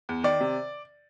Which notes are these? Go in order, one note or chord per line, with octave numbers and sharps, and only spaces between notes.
E2
D#3 D5
C3